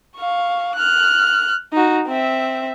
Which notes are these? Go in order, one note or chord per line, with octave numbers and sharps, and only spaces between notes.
F5 C#6
F6 F#6
D#4 F#4
C4 E5